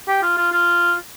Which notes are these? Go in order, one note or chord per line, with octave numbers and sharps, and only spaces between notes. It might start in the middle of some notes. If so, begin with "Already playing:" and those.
G4
F4
F4
F4